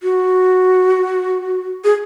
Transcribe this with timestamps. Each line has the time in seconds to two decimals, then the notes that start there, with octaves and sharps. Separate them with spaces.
0.03 F#4
1.84 G#4